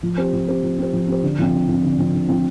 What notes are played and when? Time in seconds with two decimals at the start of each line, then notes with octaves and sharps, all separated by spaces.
0.03 F3
0.17 C4 G4 C5
0.33 F3
0.48 C4 G4 C5
0.63 F3
0.78 C4 G4 C5
0.93 F3
1.08 C4 G4 C5
1.23 D3
1.39 F3 C4
1.53 D3
1.68 F3 C4
1.83 D3
1.98 F3 C4
2.14 D3
2.28 F3 C4